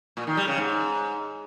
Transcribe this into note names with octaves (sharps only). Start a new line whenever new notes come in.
A#2
D#3
G3
C#3
G#2